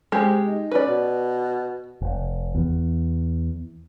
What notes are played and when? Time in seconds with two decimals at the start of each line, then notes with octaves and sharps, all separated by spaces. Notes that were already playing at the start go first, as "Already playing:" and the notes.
0.12 C3 G#3 G4
0.47 D#4
0.71 C#4 B4 D5
0.87 B2
2.02 F1
2.55 E2